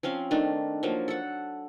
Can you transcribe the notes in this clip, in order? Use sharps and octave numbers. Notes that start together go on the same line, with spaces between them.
F3 C4 C#4 F5
D#3 A3 D4
F3 F#3 A#3
A4 F#5